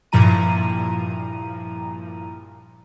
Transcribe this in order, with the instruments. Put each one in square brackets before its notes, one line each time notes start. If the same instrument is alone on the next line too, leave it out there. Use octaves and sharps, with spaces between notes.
[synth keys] G2 A#2 F3 E4 A#5 D#7